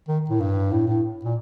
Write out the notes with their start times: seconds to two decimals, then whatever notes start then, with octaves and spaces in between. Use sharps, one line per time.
0.08 D#3
0.29 A2
0.40 G2
0.72 A2
0.87 A2
1.25 A#2